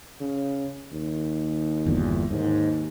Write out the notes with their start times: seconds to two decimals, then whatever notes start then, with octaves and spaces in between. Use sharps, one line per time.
0.20 C#3
0.92 D#2
1.86 G1 E2 A#2
2.31 D#2 G#2